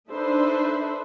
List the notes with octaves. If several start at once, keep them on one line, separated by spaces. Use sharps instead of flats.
D4 D#4 A4 B4 C5 E5